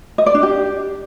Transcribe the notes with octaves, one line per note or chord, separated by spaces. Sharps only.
D#5
D5
D4
G4